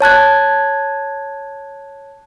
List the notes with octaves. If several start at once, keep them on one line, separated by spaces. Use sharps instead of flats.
C#5 A5 F#6 G#6